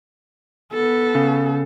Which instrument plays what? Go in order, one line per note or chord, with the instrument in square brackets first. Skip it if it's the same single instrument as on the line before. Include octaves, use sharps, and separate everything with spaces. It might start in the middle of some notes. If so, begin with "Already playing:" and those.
[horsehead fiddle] B3 A4
[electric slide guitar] C#3